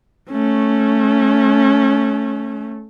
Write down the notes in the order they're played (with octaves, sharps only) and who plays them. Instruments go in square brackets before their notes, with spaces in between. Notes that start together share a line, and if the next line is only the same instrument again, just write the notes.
[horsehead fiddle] A3 C#4